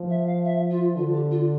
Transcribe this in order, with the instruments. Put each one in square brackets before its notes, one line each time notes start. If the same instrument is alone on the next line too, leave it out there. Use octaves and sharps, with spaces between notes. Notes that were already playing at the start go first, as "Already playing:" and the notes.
Already playing: [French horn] F3
[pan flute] E5
F5
E5
F4
[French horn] D3 [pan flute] F4
[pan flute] G4
F4